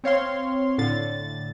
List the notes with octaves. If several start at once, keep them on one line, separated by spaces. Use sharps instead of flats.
C4 C#5 F5 C6
A2 D3 A6